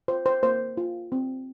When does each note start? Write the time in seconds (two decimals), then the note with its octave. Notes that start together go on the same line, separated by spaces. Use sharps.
0.08 F4 C5
0.26 C5
0.43 A#3 C5
0.77 F4
1.12 C4